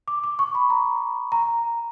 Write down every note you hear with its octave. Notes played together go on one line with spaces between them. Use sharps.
D6
D6
C#6
B5
A#5
A#5